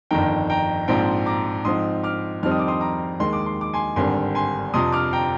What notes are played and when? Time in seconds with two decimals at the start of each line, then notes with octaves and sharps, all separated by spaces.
0.11 G1 F2 D#3 G5 A#5
0.50 G5 A#5
0.88 A#1 G#2 F3 C4 G5 A#5
1.26 A#5 D6
1.65 G#2 F3 C4 D#4 C6 D#6
2.03 D6 F6
2.43 F2 D#3 G3 C4 D#4 F6
2.51 D#6
2.59 D6
2.68 C6 D#6
2.80 A#5 D6
3.20 D#2 D#3 G#3 C6
3.33 D6
3.46 C6
3.61 D6
3.74 G#5 C6
3.96 G#1 G2 D3 G3 C4 G#5 C6
4.35 G#5 C6
4.74 F2 C3 F3 C6 D#6
4.93 D6 F6
5.13 G5 A#5